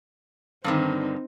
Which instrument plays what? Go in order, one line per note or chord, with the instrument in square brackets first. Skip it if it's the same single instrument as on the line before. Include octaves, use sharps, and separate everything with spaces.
[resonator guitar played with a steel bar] G2 D3 D#3 [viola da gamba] C4 D#4